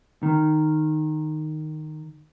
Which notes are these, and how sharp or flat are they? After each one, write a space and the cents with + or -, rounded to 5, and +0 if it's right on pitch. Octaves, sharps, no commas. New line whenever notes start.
D#3 -10